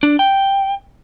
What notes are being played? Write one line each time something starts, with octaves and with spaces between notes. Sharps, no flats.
D4
G5